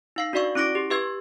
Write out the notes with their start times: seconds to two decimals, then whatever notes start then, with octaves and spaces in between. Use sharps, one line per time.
0.16 D#4 F5 C7
0.33 D4 F#4 D5 E5 C#6
0.55 C#4 E4 C#6 D6 A#6 D7
0.75 G4
0.90 G4 B4 E5 C#6 G#6